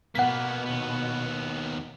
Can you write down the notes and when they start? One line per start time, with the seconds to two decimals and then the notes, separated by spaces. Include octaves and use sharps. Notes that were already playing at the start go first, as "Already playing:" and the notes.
0.15 B2 A#3 B3 F#5 B6
0.66 D#2 B3